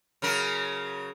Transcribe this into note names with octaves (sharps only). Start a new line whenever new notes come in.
C#3 F#3 A#4